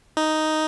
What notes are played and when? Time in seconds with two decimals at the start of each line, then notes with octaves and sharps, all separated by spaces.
0.17 D#4